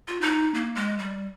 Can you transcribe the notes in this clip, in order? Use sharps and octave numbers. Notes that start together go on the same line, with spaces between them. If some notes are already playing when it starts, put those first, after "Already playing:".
F4
D#4
A#3
G#3
G3